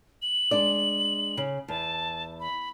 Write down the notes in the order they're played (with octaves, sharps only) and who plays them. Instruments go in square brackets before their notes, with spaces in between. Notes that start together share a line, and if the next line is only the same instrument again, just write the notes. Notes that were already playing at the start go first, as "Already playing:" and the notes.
[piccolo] F#7
[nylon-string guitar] G#3 D4 D5
C#3
[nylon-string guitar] E2 [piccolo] A5
[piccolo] B5